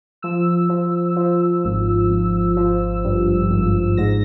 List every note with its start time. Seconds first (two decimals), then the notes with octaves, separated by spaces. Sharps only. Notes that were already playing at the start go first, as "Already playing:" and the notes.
0.22 F3 E6
0.69 F3
1.16 F3
1.64 G#1
2.10 G#1
2.57 F3
3.04 G2
3.50 G#1
3.97 G#2 A#6